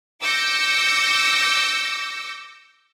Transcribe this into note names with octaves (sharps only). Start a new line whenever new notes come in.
D6 E6 G6 A#6 C#7